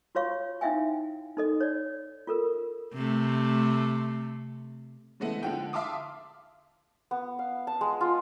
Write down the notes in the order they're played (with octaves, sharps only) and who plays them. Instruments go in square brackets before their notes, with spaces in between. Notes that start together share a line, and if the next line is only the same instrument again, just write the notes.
[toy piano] F4 F#4 C#5 F5 C#6
D#4 E4 E5 F5 G5 G#5
D#4 A4 D#5
C#5 D5
F4 A4 A#4
[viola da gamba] C3 A3
[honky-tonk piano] C#3 E3 G#3 A3 B3
D3 F3 G#3 F#5 G5
E5 F5 A5 C6 D6 D#6
[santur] B3
F5
A5
G#3
F4